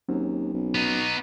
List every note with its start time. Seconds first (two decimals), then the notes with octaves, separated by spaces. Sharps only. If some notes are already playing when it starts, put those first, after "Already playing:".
0.09 D#2 F#3 C4 C#4
0.53 B1
0.75 B3 D#4